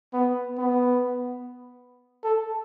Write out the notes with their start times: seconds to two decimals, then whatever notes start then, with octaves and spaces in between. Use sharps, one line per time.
0.13 B3
0.58 B3
2.24 A4